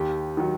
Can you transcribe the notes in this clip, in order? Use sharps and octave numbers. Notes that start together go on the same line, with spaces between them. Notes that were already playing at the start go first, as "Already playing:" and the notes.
Already playing: D#2 G4
D#3 F#3